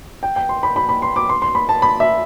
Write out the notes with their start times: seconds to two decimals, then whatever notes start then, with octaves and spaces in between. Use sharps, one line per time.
0.23 G5
0.36 G5
0.49 C6
0.63 B5
0.76 B5
0.89 B5
1.02 C6
1.16 D6
1.29 C6
1.42 C6
1.55 B5
1.69 A5
1.82 B5
2.00 E5